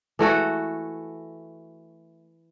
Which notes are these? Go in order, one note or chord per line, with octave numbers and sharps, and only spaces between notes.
E3 A3 F#4 A4